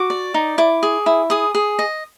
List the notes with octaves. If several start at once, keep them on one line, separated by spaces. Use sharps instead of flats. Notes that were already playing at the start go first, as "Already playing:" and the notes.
Already playing: F#4 D6
D5
D#4
E4 D6
G#4
E4
G#4 D#6
G#4
D#5